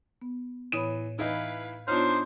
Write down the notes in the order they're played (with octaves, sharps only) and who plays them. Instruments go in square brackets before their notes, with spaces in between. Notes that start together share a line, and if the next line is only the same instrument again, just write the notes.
[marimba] B3
[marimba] A2 C#5 B5 [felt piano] E3 D#6 D#7
[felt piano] E3 D#4 E4 [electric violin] B4 F5
[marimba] B3 F4 C#5 [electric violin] D4 D#4 [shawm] C5 [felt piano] F6